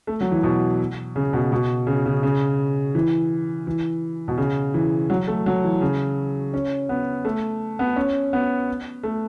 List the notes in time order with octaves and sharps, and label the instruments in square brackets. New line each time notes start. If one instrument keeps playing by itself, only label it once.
[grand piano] A3
F#3
E3
B2
C#3
B2
B2
C#3
C#3
C#3
E3
E3
B2
C#3
E3
F#3
A3
F#3
E3
C#3
C#4
B3
A3
B3
C#4
B3
A3